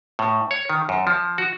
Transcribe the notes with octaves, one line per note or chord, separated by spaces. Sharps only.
A2
C#5
D#3
F#2
F3
F#4